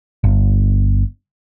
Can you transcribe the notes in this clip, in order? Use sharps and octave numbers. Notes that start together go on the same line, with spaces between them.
G1